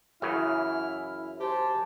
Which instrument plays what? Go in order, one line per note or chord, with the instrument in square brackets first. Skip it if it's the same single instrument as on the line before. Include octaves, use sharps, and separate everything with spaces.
[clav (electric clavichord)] F#2 C#3 E3 [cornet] E4 [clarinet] F6
[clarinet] G4 [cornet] C5 [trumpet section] G#5 A5